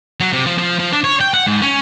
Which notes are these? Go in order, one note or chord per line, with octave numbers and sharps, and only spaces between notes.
F#3
C3
F3
F3
F3
D4
C#5
G5
F#5
G#2
C#4